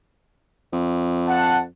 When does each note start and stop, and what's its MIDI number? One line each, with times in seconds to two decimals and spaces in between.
0.73 1.66 41
1.27 1.58 78
1.27 1.58 81